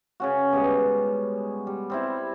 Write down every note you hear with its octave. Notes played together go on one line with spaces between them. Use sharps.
C#3 C#4 F#4
B2 G3 G#3
G3
G3 C4 E4